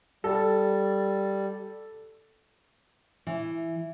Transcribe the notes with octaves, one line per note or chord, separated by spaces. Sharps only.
G3 A4
E3